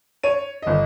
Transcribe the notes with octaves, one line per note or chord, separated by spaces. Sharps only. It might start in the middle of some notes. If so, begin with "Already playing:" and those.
C#5 D#7
G1 D#5